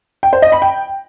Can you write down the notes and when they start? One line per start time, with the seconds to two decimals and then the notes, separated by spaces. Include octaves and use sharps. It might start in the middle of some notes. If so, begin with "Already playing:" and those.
0.23 G5
0.33 C5
0.42 D#5
0.52 B5
0.62 G5